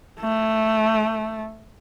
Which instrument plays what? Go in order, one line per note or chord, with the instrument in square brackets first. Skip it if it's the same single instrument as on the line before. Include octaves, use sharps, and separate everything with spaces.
[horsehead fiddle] A3